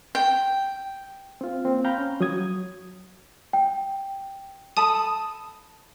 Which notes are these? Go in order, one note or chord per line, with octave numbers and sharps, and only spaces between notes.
G5
C4 F4
A#3 C4
F5 G5 A#5 B5 G6
C#4
F#3 F#4 D#6 G#6
G5
A4 A5 B5 D#6